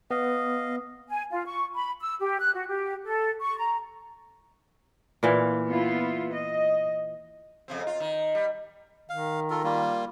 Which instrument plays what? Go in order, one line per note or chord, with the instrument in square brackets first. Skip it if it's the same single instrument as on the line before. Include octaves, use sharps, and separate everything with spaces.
[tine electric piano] B3 [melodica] D#5 F5
[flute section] G#5
F4
C#6
B5
E6
G4
F#6
F#4
G4
A4
C#6
A#5
[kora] A#2 E3 F5
[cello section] B3 E4 F4
D#5
[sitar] F2 C#3 C4
F4
D#3
G3
[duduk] D#3 [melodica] F5
[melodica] F4 A4 A#4
G3 A#3 F4